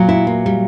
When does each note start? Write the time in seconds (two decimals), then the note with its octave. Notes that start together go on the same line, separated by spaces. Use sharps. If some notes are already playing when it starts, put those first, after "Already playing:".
Already playing: A#2 F#3
0.09 E4
0.27 A#3
0.46 G3